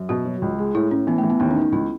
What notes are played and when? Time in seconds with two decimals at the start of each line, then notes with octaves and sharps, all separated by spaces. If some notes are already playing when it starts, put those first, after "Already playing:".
Already playing: F#2
0.09 B2 F#4
0.25 F#3
0.42 C#2
0.58 G#3
0.74 A2 E4
0.91 A2 C#4
1.07 E3 B3
1.18 A3
1.23 E3
1.30 B3
1.40 D#2 B3
1.51 C#4
1.56 D#3
1.62 D#4
1.72 C#2 E4